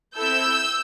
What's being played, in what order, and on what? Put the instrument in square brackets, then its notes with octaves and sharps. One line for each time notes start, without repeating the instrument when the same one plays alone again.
[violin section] C4 E4 A4 E6 G6